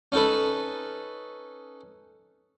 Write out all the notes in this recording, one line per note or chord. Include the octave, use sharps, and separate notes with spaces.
C#4 D#4 A4 B4